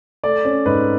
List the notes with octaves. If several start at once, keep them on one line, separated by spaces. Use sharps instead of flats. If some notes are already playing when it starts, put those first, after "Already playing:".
A3 D5
C#4
G#2 B4